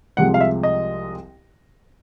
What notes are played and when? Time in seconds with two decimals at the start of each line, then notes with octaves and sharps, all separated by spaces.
0.17 C2 C3 F3 G#3 F#5
0.34 F5
0.41 E5
0.63 D#5